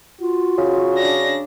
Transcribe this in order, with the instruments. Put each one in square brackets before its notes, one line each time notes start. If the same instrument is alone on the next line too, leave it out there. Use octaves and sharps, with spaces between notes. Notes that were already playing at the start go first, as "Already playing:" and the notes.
[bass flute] F4 [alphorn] F#4
[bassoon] C#3
[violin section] D4 A#6